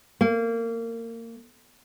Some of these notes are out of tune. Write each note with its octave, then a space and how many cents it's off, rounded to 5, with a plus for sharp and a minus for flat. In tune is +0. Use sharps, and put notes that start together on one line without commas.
A#3 -25